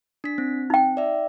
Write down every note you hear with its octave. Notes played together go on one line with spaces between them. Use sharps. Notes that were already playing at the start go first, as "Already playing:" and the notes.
D4 B6
C4
D#4 G5
D5 E5